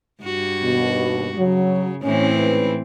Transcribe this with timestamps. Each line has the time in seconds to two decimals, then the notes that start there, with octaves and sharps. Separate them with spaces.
0.23 G2 F#4
0.62 D#2 B2
1.37 C#3 F#3
2.03 A2 E3 C4 C#4
2.36 G#2 C#4 B4